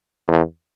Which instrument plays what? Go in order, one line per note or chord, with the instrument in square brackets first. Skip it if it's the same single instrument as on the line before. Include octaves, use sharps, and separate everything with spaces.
[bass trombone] E2